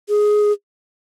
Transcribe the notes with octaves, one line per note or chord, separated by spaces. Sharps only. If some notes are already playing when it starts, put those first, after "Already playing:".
G#4